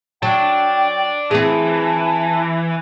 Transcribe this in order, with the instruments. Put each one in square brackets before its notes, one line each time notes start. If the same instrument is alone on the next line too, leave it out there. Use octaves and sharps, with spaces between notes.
[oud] F#3 [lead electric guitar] D5 A5 [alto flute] G5
[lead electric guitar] E3 [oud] C4 G#4 [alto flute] A5